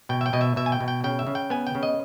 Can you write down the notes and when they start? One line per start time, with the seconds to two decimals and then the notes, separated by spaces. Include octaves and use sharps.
0.09 B2 G5
0.21 E5
0.26 G5
0.33 B2 D#5
0.41 E5
0.56 B2 E5
0.66 G#5
0.72 G5
0.80 B2
0.88 G5
1.04 C#3 G5
1.19 E5
1.27 C#3
1.35 G5
1.50 B3 G#5
1.67 G5
1.75 C#3
1.83 D#5